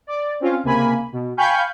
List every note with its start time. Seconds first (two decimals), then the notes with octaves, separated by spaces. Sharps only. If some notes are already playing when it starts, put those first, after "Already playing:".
0.07 D5
0.40 C4 C#4 F4
0.63 C#2 C3 A#3 G#5 B5
1.12 B2
1.37 F5 G5 G#5 B5 C#6 G6